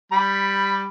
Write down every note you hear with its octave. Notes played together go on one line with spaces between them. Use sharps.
G3 B5